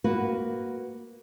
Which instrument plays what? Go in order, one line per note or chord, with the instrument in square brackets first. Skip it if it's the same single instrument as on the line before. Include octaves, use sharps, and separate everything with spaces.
[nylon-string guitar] A#3 F#4 B4